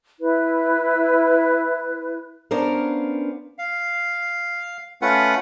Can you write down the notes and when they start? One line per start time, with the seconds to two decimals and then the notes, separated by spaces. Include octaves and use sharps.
0.20 E4 B4
2.51 B3 C#4 D4 A#4 C5 F5
3.59 F5
5.02 A3 C#4 F4 B4 F#5